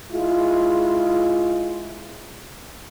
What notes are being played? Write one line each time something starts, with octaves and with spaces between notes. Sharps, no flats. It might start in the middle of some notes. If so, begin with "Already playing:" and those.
G#3 E4 F4